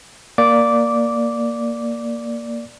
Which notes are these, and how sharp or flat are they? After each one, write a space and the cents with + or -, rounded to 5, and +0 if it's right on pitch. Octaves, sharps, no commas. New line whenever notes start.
A#3 +0 D5 +0 D6 -10